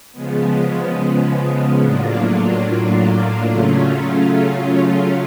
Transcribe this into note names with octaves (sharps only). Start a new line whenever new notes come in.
C#3 F3 G#3 B3
A2 F#3 A#3 D4 F4
C#3 F#3 A3 C#4 F4